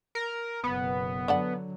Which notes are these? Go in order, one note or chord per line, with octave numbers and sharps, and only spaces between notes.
A#4
F#1 B2 B3
D3 F#3 D4 A4 F#5